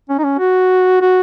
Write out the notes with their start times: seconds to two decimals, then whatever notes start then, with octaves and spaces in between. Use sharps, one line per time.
0.09 C#4
0.18 D#4
0.24 C#4
0.39 F#4
1.01 F#4